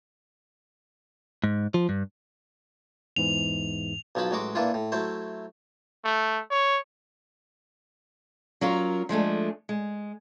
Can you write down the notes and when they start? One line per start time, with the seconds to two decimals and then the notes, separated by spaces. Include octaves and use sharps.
1.44 G#2
1.74 F3
1.89 G2
3.16 E2 G#2 E3 F7
4.15 B1 F3 F#3 A5 B5
4.31 A1 F#3 G#3 F#4 D6
4.55 A#2 E3 D4 E4 F4
4.74 A2
4.92 F#3 A3 E4 C5
6.04 A3
6.51 C#5
8.61 F#3 C#4 F4 A#4
9.09 F3 G#3 A3 D4
9.69 G#3